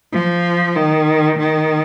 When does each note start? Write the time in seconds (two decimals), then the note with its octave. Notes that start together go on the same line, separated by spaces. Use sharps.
0.12 F3
0.76 D#3
1.38 D#3